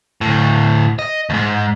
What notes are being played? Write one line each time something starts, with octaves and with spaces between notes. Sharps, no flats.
D2 A2
D#5
D#2 G#2